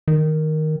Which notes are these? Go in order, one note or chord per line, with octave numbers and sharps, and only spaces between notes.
D#3